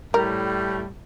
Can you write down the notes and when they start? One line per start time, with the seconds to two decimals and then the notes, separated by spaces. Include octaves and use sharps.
0.14 A2 G3 A#4